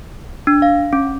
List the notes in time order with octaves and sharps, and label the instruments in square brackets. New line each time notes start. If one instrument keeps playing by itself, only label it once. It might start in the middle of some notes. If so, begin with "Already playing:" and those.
[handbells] D4
F5
C#4